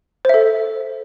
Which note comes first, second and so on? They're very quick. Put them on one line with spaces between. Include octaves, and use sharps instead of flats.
C5 E5 A4